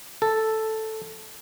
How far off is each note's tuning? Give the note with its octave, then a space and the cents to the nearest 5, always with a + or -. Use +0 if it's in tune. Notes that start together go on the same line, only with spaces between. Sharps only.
A4 +0